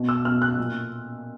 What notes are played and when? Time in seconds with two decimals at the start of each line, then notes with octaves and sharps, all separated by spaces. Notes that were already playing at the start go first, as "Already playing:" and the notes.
Already playing: B2
0.09 E6
0.25 B2 F6
0.42 F#6
0.58 A#2